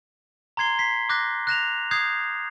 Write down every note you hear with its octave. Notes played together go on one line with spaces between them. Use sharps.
A#5 C6 G#6 C7 G7
B6 C7
D6 F#6 G6 A#6
F#6 A#6 E7 F7
D#6 G6 G#6 C7